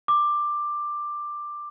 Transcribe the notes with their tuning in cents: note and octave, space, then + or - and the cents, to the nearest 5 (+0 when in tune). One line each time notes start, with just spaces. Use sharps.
D6 +10